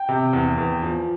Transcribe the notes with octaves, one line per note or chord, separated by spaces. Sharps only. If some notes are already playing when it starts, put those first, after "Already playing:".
Already playing: G5
C3
E2
E2
F3